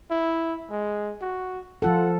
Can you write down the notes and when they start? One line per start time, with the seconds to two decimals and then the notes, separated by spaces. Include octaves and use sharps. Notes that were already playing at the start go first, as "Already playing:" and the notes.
0.11 E4
0.70 G#3
1.21 F#4
1.82 F3 F4 A4 F#5